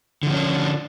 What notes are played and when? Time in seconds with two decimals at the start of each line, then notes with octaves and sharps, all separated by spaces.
0.23 D3
0.27 F3
0.30 C#4
0.34 D4